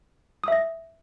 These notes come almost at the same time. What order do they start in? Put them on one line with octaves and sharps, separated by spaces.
D#6 E5 A#6